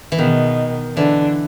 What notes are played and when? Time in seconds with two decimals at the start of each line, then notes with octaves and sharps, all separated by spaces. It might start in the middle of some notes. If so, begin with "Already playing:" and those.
0.12 E3
0.18 B2 D#3 B3
0.96 D3 E3 D4